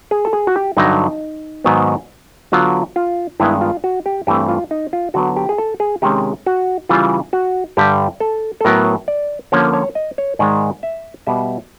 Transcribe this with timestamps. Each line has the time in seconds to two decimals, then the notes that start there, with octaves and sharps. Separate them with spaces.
0.11 G#4
0.25 A4
0.33 G#4
0.47 F#4
0.56 G4
0.77 G2 D3 F#3 D#4
1.64 G#2 D#3 F#3 B3
2.52 D3 F#3 B3 F4
2.96 F4
3.40 G2 D#3 G#3 B3 E4
3.61 F4
3.84 F#4
4.06 G4
4.27 G2 E3 A3 C4 G4
4.48 F4
4.71 D#4
4.93 F4
5.14 D3 F#3 B3 F#4
5.36 G4
5.49 G#4
5.58 A4
5.80 G#4
6.02 C3 D#3 G#3 C#4 G4
6.46 F#4
6.89 C#3 E3 G3 F4
7.33 F#4
7.77 G2 D3 G3 G4
8.20 A4
8.61 A4
8.65 A2 F#3 B3 A#4
9.08 D5
9.52 D3 F3 A#3 C#4 C#5
9.73 C#5
9.95 D#5
10.18 C#5
10.39 G#2 D#3 G#3 D5
10.83 E5
11.27 B2 G3 B3 E5